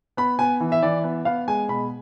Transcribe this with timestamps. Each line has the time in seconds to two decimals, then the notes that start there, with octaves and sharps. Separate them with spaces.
0.17 B3 B5
0.39 B3 G#5
0.60 E3
0.72 E5
0.82 E3 D5
1.04 B3
1.25 B3 F5
1.48 G#3 G#5
1.68 B2 B5